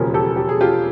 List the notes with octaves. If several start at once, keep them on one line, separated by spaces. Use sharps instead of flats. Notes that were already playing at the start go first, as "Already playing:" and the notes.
Already playing: E1 D#2 C#3 F3
G4 A4
G4
G#4
F4 G4